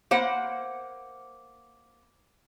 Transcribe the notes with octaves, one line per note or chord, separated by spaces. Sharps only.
A#3 C5 F#5